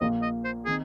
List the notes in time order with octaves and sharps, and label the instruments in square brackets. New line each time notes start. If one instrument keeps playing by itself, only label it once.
[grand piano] A#1 A#2 A#3 F4 [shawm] D#5
[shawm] D#5
C5
[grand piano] D#3 C4 D#4 [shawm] G#4